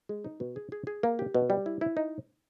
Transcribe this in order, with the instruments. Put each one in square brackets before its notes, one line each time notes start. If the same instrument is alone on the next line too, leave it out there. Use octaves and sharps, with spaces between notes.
[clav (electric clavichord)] G#3
D#4
B2
G#4
G#4
G#4
A#3
G4
B2
G3
E4
E4
D#4